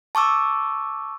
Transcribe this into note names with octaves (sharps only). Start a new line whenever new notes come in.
A5 C#6 D6 E6